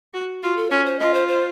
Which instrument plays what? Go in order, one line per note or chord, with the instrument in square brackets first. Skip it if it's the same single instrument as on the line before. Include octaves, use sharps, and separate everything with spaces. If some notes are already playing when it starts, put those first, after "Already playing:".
[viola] F#4
[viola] F4 [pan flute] F#4
[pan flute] A4
[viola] C#4 [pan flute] C#5
[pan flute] C5
[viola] F4 [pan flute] D#5
[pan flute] C5
C5